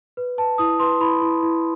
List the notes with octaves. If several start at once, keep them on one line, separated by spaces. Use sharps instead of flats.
B4
B4 A5
E4 D#6
B4 C6
E4 B5
E4
E4